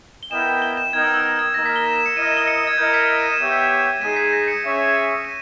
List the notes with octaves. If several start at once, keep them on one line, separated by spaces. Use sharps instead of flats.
G7
B3 E4 A#4 D#5 G5 E7
G7
E7
B3 D#4 A#4 D#5 G5 G#6
E6
E6
G#6
G#6
A#3 D#4 A#4 D#5 A#6
B6
G7
E7
E7
C#7
E4 A#4 D#5 D#7
E7
G7
C#7
G#6
E4 A#4 D#5 G6
B6
C#7
D#7
E7
B3 G4 C#5 E5
G#3 D#4 G#4 D#7
B6
A#6
C#7
C#4 G#4 C#5 E5
D#7